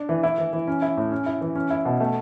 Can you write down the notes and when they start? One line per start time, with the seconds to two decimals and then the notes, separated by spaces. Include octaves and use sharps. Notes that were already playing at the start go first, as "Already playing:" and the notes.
Already playing: D4
0.09 E3
0.23 E4
0.38 E3
0.53 E3
0.67 C#4
0.82 E4
0.97 A2
1.12 C#4
1.26 E4
1.41 E3
1.55 C#4
1.70 E4
1.85 B2
2.00 A3